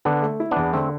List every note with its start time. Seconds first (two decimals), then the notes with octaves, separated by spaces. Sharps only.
0.05 D3 B3 D4
0.22 A3
0.40 E4
0.51 E2 B3 D4
0.73 D3 A3 C4